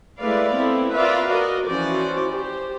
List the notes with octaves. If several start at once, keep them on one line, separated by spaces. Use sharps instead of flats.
G#3 A3 E4 B4 D5 F5
B3 C4 E4 A4
F4 A#4 B4 D5 E5 F5
F#4 A#4 D5 D#5
E3 F3 C#4 F#4 C5 D5
G4 C5